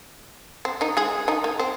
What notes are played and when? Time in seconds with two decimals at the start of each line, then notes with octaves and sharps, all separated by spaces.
0.65 C4
0.81 D#3 D#4
0.97 G#3 G#4
1.28 D#3 D#4
1.44 A#3
1.59 C4